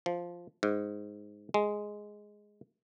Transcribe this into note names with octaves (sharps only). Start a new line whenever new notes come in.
F3
G#2
G#3